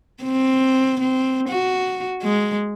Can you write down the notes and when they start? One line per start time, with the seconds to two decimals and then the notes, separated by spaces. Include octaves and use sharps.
0.24 C4
1.00 C4
1.49 F#4
2.23 G#3